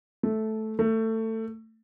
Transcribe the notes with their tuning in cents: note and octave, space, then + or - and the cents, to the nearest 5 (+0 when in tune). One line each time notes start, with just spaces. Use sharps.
A3 -10
A3 +20